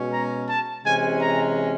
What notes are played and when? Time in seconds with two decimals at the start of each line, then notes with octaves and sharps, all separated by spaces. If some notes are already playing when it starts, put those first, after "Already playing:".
Already playing: B2 G#3 C#4
0.13 A#5
0.49 A5
0.84 C3 E3 G#3 C#4 G#5
1.20 A#5